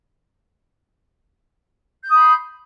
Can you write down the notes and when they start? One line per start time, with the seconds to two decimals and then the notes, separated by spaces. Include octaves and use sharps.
2.04 G6
2.09 D#6
2.14 B5
2.19 C6